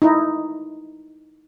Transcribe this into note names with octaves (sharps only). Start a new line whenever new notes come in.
D#4 E4